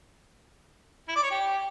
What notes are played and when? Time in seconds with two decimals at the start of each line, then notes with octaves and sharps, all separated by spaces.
1.08 E4
1.16 D5
1.23 C#5
1.30 G4